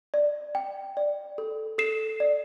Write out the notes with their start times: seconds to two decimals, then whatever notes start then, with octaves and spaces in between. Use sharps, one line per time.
0.14 D5
0.55 G5
0.97 D5
1.38 A4
1.78 A4 C7 E7
2.20 D5